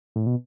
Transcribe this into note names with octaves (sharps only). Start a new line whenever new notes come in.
A2
B2